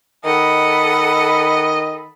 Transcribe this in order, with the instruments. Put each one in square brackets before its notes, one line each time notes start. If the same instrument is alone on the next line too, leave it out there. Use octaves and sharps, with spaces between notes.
[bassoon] D#3 [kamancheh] A4 B5 [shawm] D#5 [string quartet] F#5